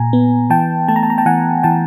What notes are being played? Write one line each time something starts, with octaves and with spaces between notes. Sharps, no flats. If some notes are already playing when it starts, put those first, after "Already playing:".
Already playing: A#2 G#5 A#5
B3
E3 G5 A5
A3 A5
A#5
A5
A#5
G5 A5
E3 F#5 G#5
E3 G5 A5